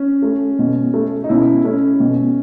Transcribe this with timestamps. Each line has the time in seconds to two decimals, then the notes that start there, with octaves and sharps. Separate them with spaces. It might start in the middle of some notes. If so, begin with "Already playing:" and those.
Already playing: C#4
0.22 A3
0.59 B2
0.94 A3
1.24 D#4
1.29 B2 C#4 E4
1.64 A3 C#4
2.00 B2